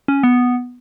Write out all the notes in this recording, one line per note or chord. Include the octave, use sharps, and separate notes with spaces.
C#4
B3